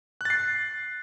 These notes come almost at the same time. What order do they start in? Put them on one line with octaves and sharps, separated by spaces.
F#6 A6 C7